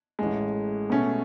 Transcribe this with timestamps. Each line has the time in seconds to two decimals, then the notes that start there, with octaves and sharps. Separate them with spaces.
0.19 A1 A2 G#3
0.90 B2 A3 C#4